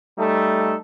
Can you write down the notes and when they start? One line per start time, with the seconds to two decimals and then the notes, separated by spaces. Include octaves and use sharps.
0.19 G3 A3 D#4 A4